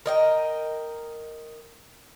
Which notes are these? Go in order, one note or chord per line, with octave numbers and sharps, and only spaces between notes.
A#4 D#5 G5